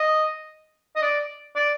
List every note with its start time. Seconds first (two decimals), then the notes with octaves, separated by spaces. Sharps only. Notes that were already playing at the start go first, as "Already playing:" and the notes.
Already playing: D#5
0.96 D#5
1.02 D5
1.56 D5